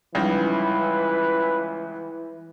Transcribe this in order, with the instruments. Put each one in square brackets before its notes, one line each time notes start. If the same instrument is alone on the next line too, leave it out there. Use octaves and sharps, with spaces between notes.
[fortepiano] C#2 [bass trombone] E3 [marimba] F3 G3 D#4 [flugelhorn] B4